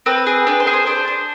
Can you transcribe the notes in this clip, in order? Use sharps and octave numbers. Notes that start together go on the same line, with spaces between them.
C4 B4
G#4
D4 B4
C5
G#4
C5
D4 C5
D4